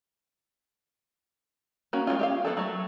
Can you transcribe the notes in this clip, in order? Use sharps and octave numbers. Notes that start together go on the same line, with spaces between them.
A#3 C#4 F#4
G#3 A#3 C#4 F4
G4 E5 F5
F3 A3 B3 A4
F#3 A3